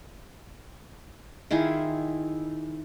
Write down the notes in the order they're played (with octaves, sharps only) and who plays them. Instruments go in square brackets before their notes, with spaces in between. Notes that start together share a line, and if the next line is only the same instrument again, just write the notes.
[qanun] D#3 E4 F4 G#4